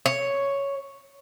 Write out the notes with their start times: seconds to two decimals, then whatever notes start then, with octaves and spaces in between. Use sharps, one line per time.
0.06 C#5